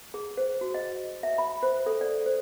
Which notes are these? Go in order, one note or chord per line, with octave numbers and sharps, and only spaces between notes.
G#4
C5
F#4
D#5
E5
B5
C5
A4
D5
C5